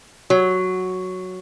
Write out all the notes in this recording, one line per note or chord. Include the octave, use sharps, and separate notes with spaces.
F#3